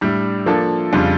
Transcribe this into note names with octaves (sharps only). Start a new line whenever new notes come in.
A2 G3 D4
F3 A#3 D4 A4
F2 C#3 G3 D4 F4